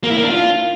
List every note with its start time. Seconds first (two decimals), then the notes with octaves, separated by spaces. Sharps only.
0.04 A#3
0.10 E4
0.17 A#3
0.24 D4
0.30 F4